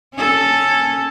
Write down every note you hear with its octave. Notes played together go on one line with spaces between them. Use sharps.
C#4 A4